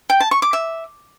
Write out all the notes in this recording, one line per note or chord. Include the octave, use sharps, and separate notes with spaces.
G5
A5
C#6
D6
E5